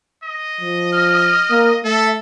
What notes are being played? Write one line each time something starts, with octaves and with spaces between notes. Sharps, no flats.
D#5
F3
F6
A#3
A3 A4 E5